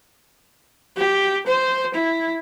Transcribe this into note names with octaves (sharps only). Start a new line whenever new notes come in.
G4
C5
E4